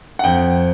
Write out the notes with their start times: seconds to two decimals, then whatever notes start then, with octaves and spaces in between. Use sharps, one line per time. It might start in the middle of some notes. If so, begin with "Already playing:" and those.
0.19 F#5
0.24 F2 G5